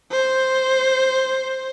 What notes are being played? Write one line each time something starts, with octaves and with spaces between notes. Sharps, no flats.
C5